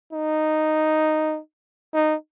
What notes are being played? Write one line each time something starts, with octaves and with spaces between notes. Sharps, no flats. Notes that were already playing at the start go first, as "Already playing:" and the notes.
D#4
D#4